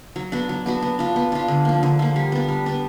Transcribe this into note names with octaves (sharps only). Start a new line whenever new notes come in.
F#3
B3 D4 F#4
F#3
B3 D4 F#4
B3
D4 F4
B3
D4 F4
D3
F3 A#3
D3
F3 A#3
G3
B3 D4
G3
B3 D4